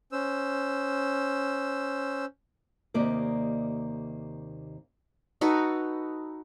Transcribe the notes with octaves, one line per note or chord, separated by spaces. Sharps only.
C#4 C5 E6
D#2 C3 A#3 D5 D#5
D#4 F#4 A4 B4